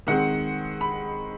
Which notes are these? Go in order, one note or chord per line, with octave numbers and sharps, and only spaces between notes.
D#3 G#3 C4 F#5
B5